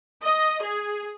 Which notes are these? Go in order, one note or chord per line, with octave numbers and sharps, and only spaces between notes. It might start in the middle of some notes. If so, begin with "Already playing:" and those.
D#5
G#4